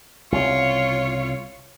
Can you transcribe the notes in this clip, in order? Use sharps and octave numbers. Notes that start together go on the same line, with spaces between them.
C2 C#3 F4 C#5